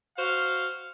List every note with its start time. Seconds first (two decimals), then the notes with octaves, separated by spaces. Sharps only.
0.17 F#4 C5 F5